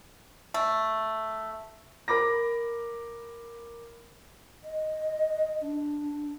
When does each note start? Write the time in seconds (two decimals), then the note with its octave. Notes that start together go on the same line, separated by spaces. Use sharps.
0.54 A3
2.08 A#4 B5 D6 A#6
4.64 D#5
5.62 D4